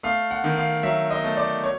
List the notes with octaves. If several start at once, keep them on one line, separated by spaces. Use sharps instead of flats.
A3 F5
F#5
D#3
F5
F#3 E5
D#5
A3
D5
C#5